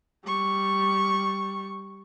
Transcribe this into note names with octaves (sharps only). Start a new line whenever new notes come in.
G3 C#6